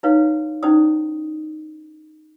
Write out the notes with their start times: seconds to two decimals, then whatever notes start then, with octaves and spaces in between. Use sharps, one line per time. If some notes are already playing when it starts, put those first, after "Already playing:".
0.03 D#4 E4 B4 C#5 F5
0.63 C#4 D#4 E4 C5 D5 D#6